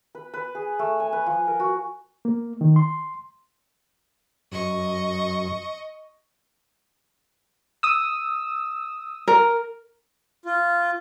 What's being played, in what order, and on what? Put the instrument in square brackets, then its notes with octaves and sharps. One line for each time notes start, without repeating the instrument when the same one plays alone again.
[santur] B4
B4
G#4
A3
G#5
B4
F3
A#4
F#4
[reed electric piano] A#3
D#3
C6
[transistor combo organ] F#2 [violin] D#5 C#6
[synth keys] D#6 E6
[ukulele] A#4
[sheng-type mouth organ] F4